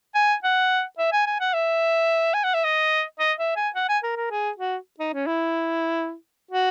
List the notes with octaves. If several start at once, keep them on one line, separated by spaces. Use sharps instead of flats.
G#5
F#5
E5
G#5
G#5
F#5
E5
G#5
F#5
E5
D#5
D#5
E5
G#5
F#5
G#5
A#4
A#4
G#4
F#4
D#4
C#4
E4
F#4